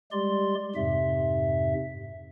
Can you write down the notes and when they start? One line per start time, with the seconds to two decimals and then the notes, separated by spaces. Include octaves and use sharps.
0.12 G3 G#3 G4 D5 C6
0.76 F2 G#2 C3 E5